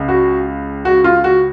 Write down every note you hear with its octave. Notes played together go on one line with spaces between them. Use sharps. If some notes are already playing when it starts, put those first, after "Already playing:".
Already playing: C#2 C#3
F#4
F#4
F4
F#4